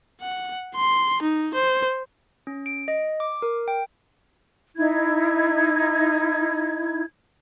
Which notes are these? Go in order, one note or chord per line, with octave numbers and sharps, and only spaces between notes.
F#5
C6
D#4
C5
C#4
D7
D#5
D6
A#4
G5
D#4 E4 G#6